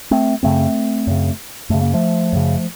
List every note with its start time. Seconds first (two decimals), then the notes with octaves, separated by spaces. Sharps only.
0.11 A3 C4
0.43 F#2 C#3 A3 C4
1.07 F#2 C#3
1.70 F#2 C#3 A3
1.82 A#3
1.94 F3 A3
2.33 F#2 C#3